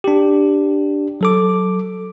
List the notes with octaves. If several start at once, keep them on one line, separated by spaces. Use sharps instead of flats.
D4 G4
F#3 A4 D6